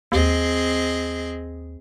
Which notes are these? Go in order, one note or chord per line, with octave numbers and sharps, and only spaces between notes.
D#2 C4 G#4 D#5